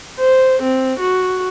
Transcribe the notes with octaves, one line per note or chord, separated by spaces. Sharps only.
C5
C4
F#4